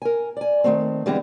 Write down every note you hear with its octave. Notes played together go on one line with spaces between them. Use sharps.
A#4 G#5
D5 G#5
D#3 F3 A3 C4
D3 E3 G3 G#3 B3 C4